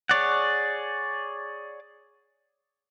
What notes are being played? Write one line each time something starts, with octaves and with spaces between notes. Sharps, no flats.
G#4 C#5 D5 F#5